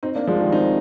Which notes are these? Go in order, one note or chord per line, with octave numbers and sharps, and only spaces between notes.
C4 D#4
A#3 D4
F3 G#3
D#3 G3
C4 D#4